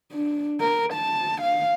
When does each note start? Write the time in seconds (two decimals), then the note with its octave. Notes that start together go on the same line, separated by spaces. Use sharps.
0.13 D4
0.60 A#4
0.93 A5
1.42 F5